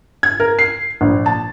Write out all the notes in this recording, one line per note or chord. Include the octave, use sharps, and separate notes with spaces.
G#6
A#4
C7
A#1
A5